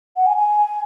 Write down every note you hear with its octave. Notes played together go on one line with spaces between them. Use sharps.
F#5
G#5
G#5